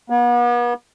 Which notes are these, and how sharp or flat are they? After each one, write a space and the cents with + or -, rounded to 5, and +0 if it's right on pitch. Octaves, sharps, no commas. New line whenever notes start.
B3 -40